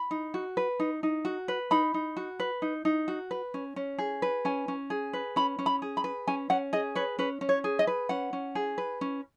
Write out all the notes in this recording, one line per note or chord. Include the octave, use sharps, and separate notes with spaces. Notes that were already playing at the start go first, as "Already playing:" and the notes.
Already playing: B5
D#4
F#4
B4
D#4
D#4
F#4
B4
D#4 B5
D#4
F#4
B4
D#4
D#4
F#4
B4
C#4
C#4
G#4
B4
C#4 G#5
C#4
G#4
B4
C#4 B5
C#4
B5
G#4
B5
B4
C#4 G#5
C#4 F#5
G#4 D#5
B4 C#5
C#4 B4
C#4
C#5
G#4
D#5
B4
C#4 F#5
C#4
G#4
B4
C#4